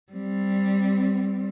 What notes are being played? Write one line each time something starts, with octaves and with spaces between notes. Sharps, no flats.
G3 C4